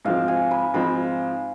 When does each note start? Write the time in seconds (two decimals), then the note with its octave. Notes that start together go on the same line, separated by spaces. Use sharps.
0.05 G#2 F3 C4 F5
0.28 G#5
0.51 B5
0.74 G#2 F3 C4 B5